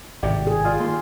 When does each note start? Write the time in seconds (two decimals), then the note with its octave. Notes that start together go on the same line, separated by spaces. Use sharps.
0.23 G#1 A2 C3 G4 D5 E5
0.47 G#4
0.64 F4 D5 D#6
0.80 A#2 D#3 C6